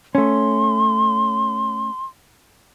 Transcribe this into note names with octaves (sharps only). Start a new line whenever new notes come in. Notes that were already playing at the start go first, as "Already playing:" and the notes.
A3 C#4 C6